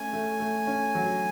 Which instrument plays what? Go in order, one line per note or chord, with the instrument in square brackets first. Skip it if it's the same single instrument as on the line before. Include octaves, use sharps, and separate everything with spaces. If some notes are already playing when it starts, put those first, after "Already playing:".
Already playing: [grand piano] A3 C#4 [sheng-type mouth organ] G#5
[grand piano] A3
A3
C#4
F#3